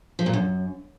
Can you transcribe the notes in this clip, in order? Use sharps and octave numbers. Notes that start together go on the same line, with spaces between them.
F3
A#2
F#2